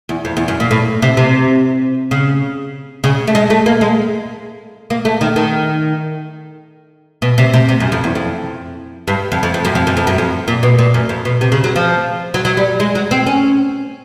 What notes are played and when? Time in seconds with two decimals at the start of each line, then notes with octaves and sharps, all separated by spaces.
0.09 E2
0.25 F2
0.37 E2
0.48 F#2
0.60 A#2
0.71 A2
1.02 C3
1.17 C3
2.11 C#3
3.04 C#3
3.27 A3
3.35 G#3
3.50 A3
3.66 A#3
3.81 G#3
4.90 A#3
5.05 A3
5.21 D#3
5.36 D#3
7.22 B2
7.38 C3
7.54 C3
7.69 C3
7.80 F#2
7.92 F2
8.04 E2
8.15 F2
9.08 G2
9.32 F2
9.43 F2
9.54 F2
9.65 F#2
9.75 F2
9.87 F#2
9.97 F2
10.07 F#2
10.18 F2
10.48 A#2
10.63 B2
10.79 A#2
10.94 F#2
11.09 F2
11.25 B2
11.41 C3
11.52 C#3
11.64 F#3
11.76 F3
12.34 F#3
12.45 F#3
12.57 G3
12.80 G#3
12.95 F#3
13.11 C4
13.27 C#4